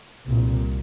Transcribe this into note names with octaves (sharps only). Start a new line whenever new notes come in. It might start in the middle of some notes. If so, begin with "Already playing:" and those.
C2 A#2